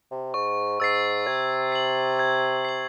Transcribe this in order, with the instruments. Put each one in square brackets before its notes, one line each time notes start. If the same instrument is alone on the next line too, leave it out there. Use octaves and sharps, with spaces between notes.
[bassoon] C3
[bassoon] G#2 [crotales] C#6
[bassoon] G#2 [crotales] E6 A6 C7
[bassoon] C3 [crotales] G#6
[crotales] C7 F#7
G#6
C7 F#7